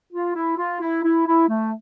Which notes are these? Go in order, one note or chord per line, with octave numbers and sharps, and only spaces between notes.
F4
E4
F4
E4
E4
E4
A3